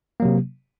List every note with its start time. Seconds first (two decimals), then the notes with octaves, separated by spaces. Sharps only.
0.20 A#3
0.22 F#3
0.25 C3